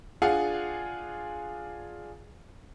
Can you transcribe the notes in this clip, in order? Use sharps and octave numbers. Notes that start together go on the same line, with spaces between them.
D4 F4 G#4 F5 F#5 G#5